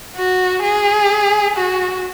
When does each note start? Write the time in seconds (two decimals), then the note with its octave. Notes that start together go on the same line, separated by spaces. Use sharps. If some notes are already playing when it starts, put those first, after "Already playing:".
0.16 F#4
0.62 G#4
1.56 F#4